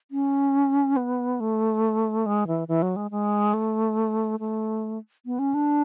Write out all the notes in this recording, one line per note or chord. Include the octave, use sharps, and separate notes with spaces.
C#4
B3
A3
G#3
E3
E3
F#3
G#3
G#3
A3
A3
B3
C#4
D4